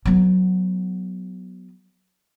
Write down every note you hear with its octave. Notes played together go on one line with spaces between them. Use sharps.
F#3 B3